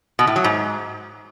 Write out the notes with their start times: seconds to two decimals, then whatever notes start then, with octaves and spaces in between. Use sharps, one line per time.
0.19 B2
0.27 A2
0.36 F#3
0.44 G#2